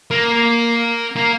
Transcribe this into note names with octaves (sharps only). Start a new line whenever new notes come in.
A#3
A#3